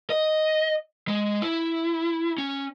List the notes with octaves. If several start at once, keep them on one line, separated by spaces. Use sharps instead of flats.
D#5
G#3
E4
C#4